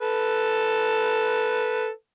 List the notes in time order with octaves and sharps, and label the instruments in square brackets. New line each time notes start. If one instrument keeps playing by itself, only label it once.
[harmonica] A4 B4